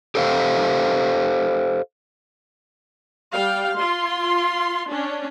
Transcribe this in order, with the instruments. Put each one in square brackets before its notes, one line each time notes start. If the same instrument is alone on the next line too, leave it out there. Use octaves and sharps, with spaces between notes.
[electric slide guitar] G4 A4 C5 E5 F5
[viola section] G3 F5 G5
F4 C6
C#4 D4